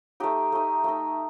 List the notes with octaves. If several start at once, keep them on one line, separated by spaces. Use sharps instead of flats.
A3 D#4 G4
A3 D#4
A3 D#4